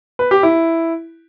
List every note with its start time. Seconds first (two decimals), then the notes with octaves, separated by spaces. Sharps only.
0.19 B4
0.31 G4
0.43 E4